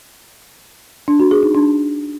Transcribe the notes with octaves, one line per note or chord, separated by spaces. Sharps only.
D4
F#4
G#4
D#4
D4